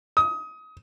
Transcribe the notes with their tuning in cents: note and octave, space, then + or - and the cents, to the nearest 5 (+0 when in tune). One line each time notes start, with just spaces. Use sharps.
D#6 +25